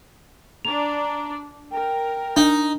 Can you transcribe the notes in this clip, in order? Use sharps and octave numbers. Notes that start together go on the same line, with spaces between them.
D4 D5 A#5 F7
A#4 G5
D4 D#4